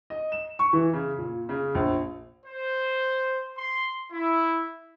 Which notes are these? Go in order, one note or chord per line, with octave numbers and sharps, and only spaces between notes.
D#5
E7
C#6
E3
C#3
A#2
C#3
A#1
C5
C6
E4